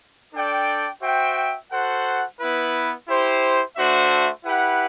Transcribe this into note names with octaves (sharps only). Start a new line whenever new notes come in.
D4 A4 D5 G5
F#4 C5 E5 G5
F#4 A4 C5 F#5
B3 E4 B4
E4 G4 C5
A3 D4 F#4 C5 E5
E4 G4 B4 F#5